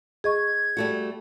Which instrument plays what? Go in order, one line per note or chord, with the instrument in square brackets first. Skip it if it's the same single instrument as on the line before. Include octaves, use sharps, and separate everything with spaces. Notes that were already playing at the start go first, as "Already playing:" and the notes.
[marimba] G#4 D#5 C#6 [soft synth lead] G#6
[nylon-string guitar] G3 A3 F#4